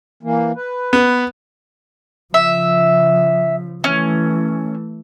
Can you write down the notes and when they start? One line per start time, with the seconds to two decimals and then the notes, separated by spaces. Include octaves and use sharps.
0.23 E3 A#3
0.56 B4
0.93 B3
2.34 C#3 F3 E5
3.84 E3 A3 C#4